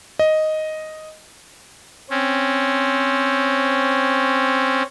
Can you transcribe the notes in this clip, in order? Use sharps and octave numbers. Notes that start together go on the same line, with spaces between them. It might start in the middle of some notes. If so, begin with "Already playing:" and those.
D#5
C4 C#4